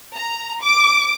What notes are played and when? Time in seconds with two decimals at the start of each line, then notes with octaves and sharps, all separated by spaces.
0.14 A#5
0.62 D6